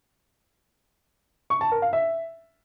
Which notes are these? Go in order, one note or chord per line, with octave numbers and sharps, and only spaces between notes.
C#6
A5
A#4
F5
E5